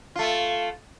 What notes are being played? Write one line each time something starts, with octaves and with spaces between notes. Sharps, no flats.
A3 F4